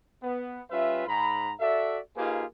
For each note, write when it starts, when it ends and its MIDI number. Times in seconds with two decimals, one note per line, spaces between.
0.22 0.62 59
0.71 1.05 55
0.71 1.05 61
0.71 1.05 65
0.71 1.05 71
0.71 1.05 76
1.07 1.53 44
1.07 1.53 82
1.07 1.53 83
1.59 1.98 66
1.59 1.98 69
1.59 1.98 74
1.59 1.98 76
2.16 2.44 58
2.16 2.44 63
2.16 2.44 65
2.16 2.44 67
2.16 2.44 68
2.16 2.44 71